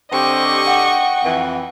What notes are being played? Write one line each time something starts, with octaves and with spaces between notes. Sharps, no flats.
D3 C4 G4 D#5 C#6
F#5 G5
F2 E3